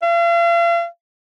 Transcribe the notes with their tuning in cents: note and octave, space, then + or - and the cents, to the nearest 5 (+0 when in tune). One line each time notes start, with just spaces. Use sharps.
F5 -40